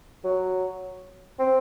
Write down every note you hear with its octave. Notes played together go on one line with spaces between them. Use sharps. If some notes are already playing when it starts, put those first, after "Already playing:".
F#3
C4